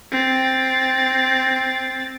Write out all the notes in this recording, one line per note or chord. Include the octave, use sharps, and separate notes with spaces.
C4 A6